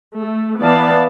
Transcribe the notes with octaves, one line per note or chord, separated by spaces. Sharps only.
A3
E3 B3 D5 F5 A5